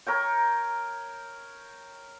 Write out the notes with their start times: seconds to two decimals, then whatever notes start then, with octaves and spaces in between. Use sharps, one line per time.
0.06 A#4 C#5 G5